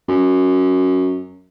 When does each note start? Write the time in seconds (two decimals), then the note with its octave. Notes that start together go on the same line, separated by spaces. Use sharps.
0.08 F#2